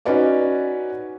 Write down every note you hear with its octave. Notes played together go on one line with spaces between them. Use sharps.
C#4 D#4 F#4 B4 C#5 D5